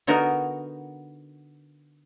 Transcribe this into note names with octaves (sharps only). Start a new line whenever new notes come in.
D3 B3 D#4 F#4 A#4